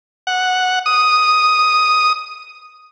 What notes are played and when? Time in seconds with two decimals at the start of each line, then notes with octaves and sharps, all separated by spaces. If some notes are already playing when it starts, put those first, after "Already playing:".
0.27 F#5
0.86 D#6